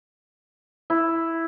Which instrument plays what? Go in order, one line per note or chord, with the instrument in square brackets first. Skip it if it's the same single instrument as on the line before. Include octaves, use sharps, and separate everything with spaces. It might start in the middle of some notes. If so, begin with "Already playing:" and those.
[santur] E4